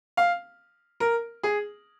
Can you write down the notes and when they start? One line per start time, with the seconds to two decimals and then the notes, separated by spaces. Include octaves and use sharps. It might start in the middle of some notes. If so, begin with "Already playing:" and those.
0.17 F5
1.00 A#4
1.43 G#4